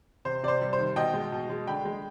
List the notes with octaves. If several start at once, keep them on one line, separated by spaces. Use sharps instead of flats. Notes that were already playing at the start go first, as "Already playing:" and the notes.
C3 C5
C3 C5 D5
G3
C5
D#3
B2 D#5 G5
G#3
B2
G#3
D3 G5 B5
G#3